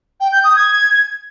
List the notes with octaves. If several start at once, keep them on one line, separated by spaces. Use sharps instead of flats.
G5
G6
D#6
G#6